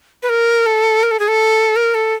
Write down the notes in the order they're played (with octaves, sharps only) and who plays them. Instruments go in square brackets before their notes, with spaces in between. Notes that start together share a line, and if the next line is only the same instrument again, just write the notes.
[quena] B4
A#4
A4
A#4
A4
G#4
A4
A#4
A4